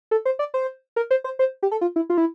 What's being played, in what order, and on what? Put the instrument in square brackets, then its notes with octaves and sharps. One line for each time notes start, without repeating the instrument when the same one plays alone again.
[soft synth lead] A4
C5
D5
C5
A#4
C5
C5
C5
G4
A4
F4
E4
F4
E4